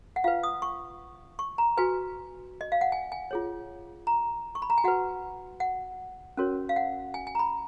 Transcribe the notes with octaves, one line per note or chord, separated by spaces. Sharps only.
F#5
F4 B4 F5
D#6
C#6
C#6
A#5
F#4 B4 G#5
D#5
F5
F#5
G#5
G#5
F4 G#4 C#5
A#5
C#6
B5
A#5
G#5
F#4 B4 F#5
F#5
C#4 F#4 A#4 C#5
F5
F#5
G#5
G#5
A#5
B5